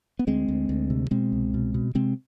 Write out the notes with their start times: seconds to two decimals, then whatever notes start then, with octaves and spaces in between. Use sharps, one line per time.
0.19 B3
0.27 D2 G#3 C4
0.48 D2
0.69 D2
0.90 C3
1.11 B2 G#3 C4
1.32 C2
1.54 B2
1.74 B2
1.95 C3 G#3 C4